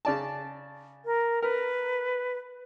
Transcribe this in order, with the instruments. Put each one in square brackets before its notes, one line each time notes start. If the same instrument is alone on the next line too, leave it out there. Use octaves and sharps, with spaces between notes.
[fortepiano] C#3 D5 A5
[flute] A#4
[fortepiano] A#4 [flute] B4